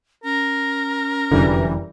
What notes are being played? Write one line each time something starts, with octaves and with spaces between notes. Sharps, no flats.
C#4 A#4
F1 F#2 D3 E3 G3